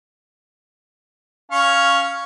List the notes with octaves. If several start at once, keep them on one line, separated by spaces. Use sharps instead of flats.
C#4 F5 C#6